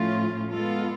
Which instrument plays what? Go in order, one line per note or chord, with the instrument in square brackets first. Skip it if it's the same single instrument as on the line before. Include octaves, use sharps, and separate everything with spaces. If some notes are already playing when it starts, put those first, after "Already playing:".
Already playing: [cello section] A2 F3 A3 C#4 F4
G#3 B3 F4 A4